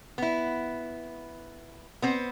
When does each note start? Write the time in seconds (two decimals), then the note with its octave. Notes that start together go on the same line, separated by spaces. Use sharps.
0.18 B3 E4
2.02 B3 C4 C5